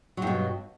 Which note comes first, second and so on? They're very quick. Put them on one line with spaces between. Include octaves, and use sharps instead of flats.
F#3 G2 B2